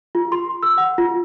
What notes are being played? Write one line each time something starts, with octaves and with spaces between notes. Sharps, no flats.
F4
C6
E6
F#5
F4